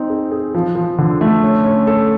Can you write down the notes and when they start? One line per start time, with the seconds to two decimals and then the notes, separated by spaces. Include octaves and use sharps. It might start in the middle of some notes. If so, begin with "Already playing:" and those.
Already playing: C4 D#4
0.10 G#4
0.31 G#4
0.54 F3
0.75 F3
0.98 D3
1.21 A3
1.42 C#4
1.64 C#4
1.87 A4